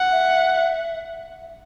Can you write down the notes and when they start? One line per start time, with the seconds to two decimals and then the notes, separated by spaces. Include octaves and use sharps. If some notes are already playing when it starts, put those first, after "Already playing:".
Already playing: F#5
0.11 E5